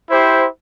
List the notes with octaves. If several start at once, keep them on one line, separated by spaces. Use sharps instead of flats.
E4 G4 C5